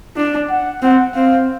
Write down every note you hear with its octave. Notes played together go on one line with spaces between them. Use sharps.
D4
F#5
C4 F#5
C4 F5